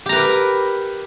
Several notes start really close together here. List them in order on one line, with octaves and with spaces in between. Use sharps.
G4 A#5 B4 A#4